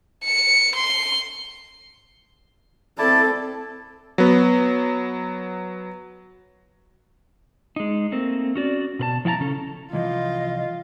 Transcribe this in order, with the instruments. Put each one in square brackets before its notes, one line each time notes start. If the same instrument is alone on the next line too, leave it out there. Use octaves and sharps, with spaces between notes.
[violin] C#7
C6
[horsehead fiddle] C4 A4 [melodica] E4 D5 A5
[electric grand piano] F#3 B3
[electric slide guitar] G#3 D#4
A3 A#3 C4
C#4 F#4 D5
B2 B4 A5
F3 E4 F5 A5 A#5
C#3 C#4 A4
[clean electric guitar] C2 E3 F3 [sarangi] F4 [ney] D#5